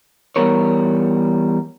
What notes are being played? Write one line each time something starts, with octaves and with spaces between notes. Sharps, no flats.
E3 G3 B3 A#4 C#5